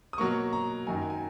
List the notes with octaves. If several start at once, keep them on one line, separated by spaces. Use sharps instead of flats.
D#6
B2 F#3 A#3 C#6
A#5
F#2 D#3 F#3 G#5
G#5